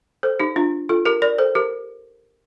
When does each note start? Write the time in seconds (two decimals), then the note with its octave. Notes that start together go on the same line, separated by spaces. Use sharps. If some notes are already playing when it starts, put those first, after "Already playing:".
0.23 A4 C5
0.40 D#4 G4
0.56 D4 F4
0.89 F4 A4
1.05 G4 A#4
1.22 A#4 D5
1.38 A4 C5
1.55 G4 A#4